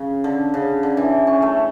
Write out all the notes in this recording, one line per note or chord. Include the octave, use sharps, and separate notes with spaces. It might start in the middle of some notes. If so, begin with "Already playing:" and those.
Already playing: C#3
D3
C#3
D3
E3
C#4
A3